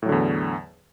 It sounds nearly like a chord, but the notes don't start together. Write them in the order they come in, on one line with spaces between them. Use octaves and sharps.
A2 F#3 D3 E2